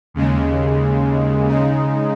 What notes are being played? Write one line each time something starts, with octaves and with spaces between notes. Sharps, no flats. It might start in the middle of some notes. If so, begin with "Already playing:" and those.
D#2 C#3 G#3
C#3 G#3 D#4